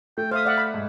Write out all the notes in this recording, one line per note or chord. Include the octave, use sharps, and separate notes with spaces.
A3 G5
C5 E5 F5 D#6
D5 E5 F#5
B5
G#2